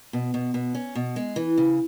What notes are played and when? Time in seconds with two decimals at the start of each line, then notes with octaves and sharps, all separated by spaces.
0.13 B2
0.34 B2
0.54 B2
0.75 C#4
0.95 B2
1.16 G#3
1.36 E3
1.58 C#3